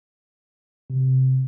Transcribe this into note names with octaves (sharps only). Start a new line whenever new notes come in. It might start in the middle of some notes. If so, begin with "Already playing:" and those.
C3